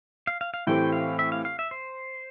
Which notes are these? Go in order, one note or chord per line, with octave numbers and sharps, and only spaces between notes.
F5
F5
F5
A2 E3 A3 C4 G4 G5
F5
E5
F5
F5
E5
C5